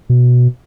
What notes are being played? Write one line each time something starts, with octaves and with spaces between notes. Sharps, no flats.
B2